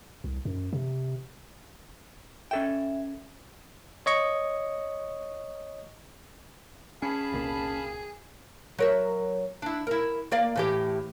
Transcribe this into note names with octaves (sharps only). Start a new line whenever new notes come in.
C2
F#2
C3
C#4 A4 E5 G5
C#5 D#5 C#6
C#4 G#4 F5 A5 B5
F1 C2 A#2
F#3 A#4 E5
D4 E4
E4 A#4
A#3 D5 F5
A2 E3 G4